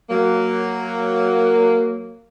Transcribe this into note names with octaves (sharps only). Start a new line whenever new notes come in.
F#3 A#3